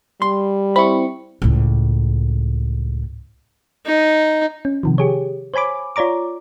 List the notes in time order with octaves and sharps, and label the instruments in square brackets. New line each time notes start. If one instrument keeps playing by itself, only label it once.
[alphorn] G3 [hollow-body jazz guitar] C6
[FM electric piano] C4 E4 C#6 [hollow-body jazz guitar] B5
[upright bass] C#2 A2
[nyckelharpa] D#4
[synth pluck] C#4
C3 D#3 F3
G4 G#4 C#5
C5 C#5 G#5 B5 D6
F4 C#5 D5 A#5 D6